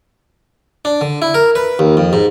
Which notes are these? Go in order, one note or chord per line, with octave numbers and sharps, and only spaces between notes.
D4
D3
E4
A#4
B4
D#2
F2
G#2